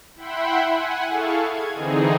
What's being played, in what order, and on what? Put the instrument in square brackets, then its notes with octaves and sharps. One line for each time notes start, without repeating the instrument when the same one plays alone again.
[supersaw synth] E4 E5 F#5 G5 B5 C6
F#5 G#5
E4 G#4 A4 F5 C#6
G#6
D3 E3 C4 D#4 G#4